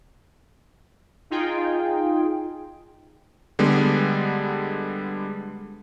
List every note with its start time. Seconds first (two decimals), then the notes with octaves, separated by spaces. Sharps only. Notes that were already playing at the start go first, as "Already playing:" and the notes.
1.30 D#4 F4 G#4 G5
3.59 D3 G3 G#3 B3